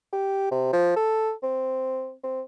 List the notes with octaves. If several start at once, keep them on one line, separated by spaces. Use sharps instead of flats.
G4
C3
F3
A4
C4
C4